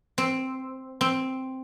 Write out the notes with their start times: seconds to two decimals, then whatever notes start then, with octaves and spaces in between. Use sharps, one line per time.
0.18 C4
1.01 C4